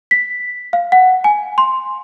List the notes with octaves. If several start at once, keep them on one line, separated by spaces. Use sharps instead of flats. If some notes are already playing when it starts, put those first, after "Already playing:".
B6
F5
F#5
G#5
C6